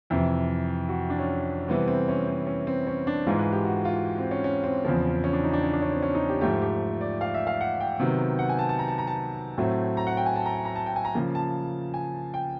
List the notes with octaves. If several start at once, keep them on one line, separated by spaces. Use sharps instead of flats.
F2 C3 E3 E4
F#4
D4
C#4
C3 E3 G3 B3 C4
C4
C#4
C4
C#4
C4
C#4
D4
G#2 E3 G#3 F4
B4
G4
F#4
F4
C4
C#4
C#4
C4
E2 C#3 F3
C#4
D4
D#4
D4
C#4
D4
C#4
C4
C#4
D#4
G4
G#2 F3 A3 G4
G4
D5
F5
E5
F5
F#5
G5
C3 D#3 F#3 B3
F#5
G#5
A5
A5
A#5
A5
A#5
A5
A2 F#3 A3 C4
A#5
F#5
G5
G#5
A5
A#5
A#5
A5
G5
G#5
A#5
C#3 F3 A#3
A5
G#5
G5